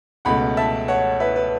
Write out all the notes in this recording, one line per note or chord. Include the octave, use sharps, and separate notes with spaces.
C#2 B2 A3 F#5 B5
E5 A5
C#5 F#5
B4 E5
B4